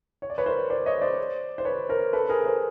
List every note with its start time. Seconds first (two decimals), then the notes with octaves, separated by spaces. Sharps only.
0.22 C#5
0.30 D5
0.38 B4 C#5
0.46 A#4 C5
0.70 C5 D5
0.86 C#5 D#5
1.01 C5 D5
1.58 C5
1.65 B4 C#5
1.89 A#4 C5
2.13 A4 B4
2.29 G#4 A#4
2.45 A#4 C5